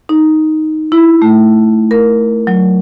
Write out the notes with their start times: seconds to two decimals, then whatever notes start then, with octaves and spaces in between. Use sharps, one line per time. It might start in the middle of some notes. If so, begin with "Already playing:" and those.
0.09 D#4
0.92 E4
1.22 A3
1.91 A#4
2.47 F#3